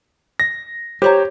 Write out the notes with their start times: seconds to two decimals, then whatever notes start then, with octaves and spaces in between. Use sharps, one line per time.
0.40 A#6
1.02 G4 C5 C#5 A#5